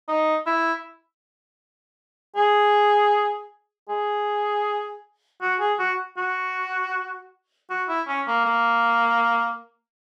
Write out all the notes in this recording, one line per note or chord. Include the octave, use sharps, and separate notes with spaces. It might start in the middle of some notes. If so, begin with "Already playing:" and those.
D#4
E4
G#4
G#4
F#4
G#4
F#4
F#4
F#4
E4
C#4
A#3
A#3